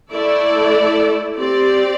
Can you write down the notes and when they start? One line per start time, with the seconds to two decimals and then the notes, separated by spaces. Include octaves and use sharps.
0.12 A3 E4 A4 D5
1.37 C4 G4 D5